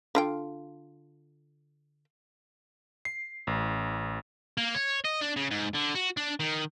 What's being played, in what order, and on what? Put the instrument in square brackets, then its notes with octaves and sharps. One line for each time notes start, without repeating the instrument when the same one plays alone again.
[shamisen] D3 F4 G5
[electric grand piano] C7
A1
[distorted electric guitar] A#3
C#5
D#5
D4
C#3
G#2
D3
F#4
D4
D#3